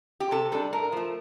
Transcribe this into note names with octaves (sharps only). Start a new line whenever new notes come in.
G4
C3 A4
G3 D4 A4
A2 A#4
F3 A3